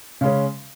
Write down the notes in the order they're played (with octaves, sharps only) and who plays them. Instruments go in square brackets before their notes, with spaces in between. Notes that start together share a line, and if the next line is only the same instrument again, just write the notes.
[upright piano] C#3 G#3 C#4